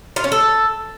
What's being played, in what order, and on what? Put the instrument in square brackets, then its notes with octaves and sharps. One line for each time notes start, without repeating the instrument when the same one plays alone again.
[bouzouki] F4
C#4
A4